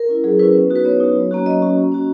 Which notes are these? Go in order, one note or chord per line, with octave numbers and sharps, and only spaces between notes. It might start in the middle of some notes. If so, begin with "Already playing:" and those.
Already playing: A#4
C#4 E4
F#3 G#4
C#4 E4 B4
B3
D#4 F#4
B4
B3 C#5
D#4 F#4
F#3
A#3 C#4 F#4
F#3 D#5
A#3 C#4 F#4
A#3
C#4 F#4